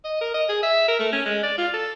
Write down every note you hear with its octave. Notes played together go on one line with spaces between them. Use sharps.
D#5
A#4
D#5
G#4
E5
A#4
A3
C#4
G#3
D5
F4
A4